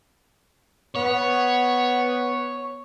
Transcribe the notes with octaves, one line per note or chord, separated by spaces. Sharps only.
B3 C#5